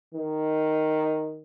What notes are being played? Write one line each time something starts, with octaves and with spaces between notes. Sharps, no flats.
D#3